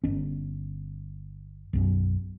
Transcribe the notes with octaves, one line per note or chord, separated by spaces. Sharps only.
G1 C#4
B1 F#2